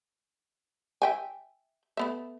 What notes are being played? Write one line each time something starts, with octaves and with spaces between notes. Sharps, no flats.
E5 G5 G#5
A3 B3 E5